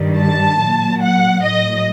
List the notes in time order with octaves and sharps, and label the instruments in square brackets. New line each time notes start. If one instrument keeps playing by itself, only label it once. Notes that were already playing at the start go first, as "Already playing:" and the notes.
Already playing: [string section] G2 D#3 G3
A5
A#2 F#3
F#5
A2 F#3 D#5